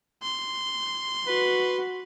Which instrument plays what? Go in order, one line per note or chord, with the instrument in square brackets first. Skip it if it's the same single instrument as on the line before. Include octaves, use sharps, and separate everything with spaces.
[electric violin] C6
[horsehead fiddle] F#4 [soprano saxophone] B4